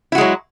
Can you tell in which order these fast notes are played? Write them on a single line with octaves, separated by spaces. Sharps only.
E4 F#4 G#3 F#3